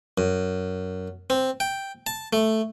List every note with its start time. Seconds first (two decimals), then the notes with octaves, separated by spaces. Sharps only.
0.18 F#2
1.30 C4
1.60 G5
2.07 A5
2.33 A3